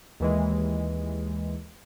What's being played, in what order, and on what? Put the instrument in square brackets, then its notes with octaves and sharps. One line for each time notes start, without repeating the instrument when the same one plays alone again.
[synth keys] D#2 E3 G#3